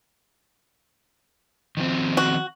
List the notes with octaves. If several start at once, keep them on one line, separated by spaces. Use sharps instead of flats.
D#3 F3 C4
F#4